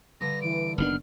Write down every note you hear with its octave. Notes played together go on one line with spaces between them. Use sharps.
G2 D3 A#6
E3 D7
F#1 D#3 B3 D4 F6